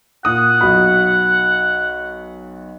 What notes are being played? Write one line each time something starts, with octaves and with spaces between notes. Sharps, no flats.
A#2 F#5 D#6
B1 F#4 B5